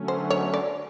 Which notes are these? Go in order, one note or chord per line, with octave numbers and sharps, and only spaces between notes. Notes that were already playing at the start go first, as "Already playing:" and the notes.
Already playing: D3 F#3 A3 C#4
C5
C#5
D5